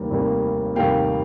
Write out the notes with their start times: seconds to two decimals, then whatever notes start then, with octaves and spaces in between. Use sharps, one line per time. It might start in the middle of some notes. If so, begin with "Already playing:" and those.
Already playing: F1 D#2 D#3 G3 A#3
0.10 F1 D#2 D#3 G3 A#3
0.75 F1 D#2 D#3 G3 A#3 F5 G5